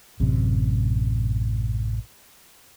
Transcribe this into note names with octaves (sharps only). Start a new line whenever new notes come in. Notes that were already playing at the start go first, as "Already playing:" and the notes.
A1 F#2 C3